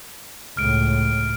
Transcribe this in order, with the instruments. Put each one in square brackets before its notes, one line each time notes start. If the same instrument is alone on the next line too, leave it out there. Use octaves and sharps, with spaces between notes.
[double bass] C#2 A2 [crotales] F6 D7